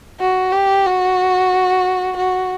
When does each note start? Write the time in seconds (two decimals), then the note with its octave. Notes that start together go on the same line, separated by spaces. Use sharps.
0.20 F#4
0.52 G4
0.86 F#4
2.17 F#4